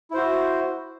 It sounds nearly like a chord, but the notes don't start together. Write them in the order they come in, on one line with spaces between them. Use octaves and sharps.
E4 C5 F#4